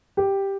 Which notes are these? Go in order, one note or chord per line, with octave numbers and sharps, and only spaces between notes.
G4